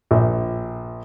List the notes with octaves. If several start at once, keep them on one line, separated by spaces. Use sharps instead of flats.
A#1